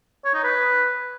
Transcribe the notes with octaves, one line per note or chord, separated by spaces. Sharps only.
C#5
D#4
B4